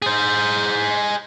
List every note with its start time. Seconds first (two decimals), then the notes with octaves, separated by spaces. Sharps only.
0.02 G#4 C5